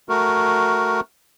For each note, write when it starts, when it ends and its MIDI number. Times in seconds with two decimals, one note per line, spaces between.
0.09 1.00 57
0.09 1.00 66
0.09 1.00 70